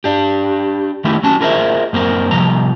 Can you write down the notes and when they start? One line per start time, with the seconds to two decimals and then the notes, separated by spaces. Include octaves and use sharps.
0.04 D4 G4
1.04 D#3 A3 D#4 E4 G4
1.23 F#3 C#4 A5
1.40 F4 G#4 A#4 C5 D#5 E5
1.93 F#2 A#3 C4 A#4
2.31 C3 F3 G3 A#5